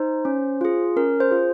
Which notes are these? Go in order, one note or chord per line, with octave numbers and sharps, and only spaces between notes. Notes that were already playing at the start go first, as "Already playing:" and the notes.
Already playing: D#4 C5
C#4
F4 G#4
C#4 A#4
C5
F4 G#4